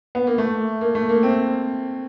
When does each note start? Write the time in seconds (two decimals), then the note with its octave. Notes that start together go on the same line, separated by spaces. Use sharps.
0.15 B3
0.27 A#3
0.38 A3
0.81 A#3
0.95 A3
1.09 A#3
1.23 C4